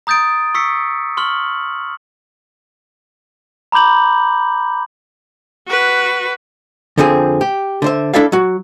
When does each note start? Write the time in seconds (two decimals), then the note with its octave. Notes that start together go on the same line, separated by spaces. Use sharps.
0.07 A#5 D#6 G6 A6 D7
0.54 C#6 E6 B6 C#7
1.17 C6 C#6 F6 F#7
3.72 A#5 B5 D6 G6 F#7
5.67 F#4 B4
6.98 F2 D3 F3 C4 G#4
7.41 G4
7.82 D3 C5 E5
8.14 D4 E4 A4 D5 E5 F5
8.32 F#3 F#4